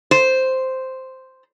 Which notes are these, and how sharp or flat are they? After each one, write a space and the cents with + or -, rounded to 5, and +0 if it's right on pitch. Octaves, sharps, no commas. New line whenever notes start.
C5 -5